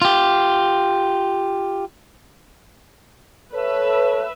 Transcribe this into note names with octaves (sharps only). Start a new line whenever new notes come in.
F4 G4
A4 B4 C#5 E5